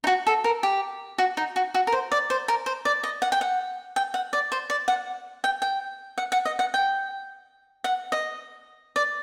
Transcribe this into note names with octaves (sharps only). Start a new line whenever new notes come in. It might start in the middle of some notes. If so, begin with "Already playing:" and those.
D#4
F#4
A4
A#4
G4
F#4
D#4
F#4
F#4
A#4
C5
D5
C5
A#4
C5
D5
D#5
F#5
G5
F#5
G5
F#5
D5
C5
D5
F#5
G5
G5
F#5
F#5
D#5
F#5
G5
F#5
D#5
D5